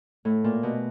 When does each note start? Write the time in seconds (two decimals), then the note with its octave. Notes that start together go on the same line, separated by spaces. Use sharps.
0.25 A2
0.44 A#2
0.63 B2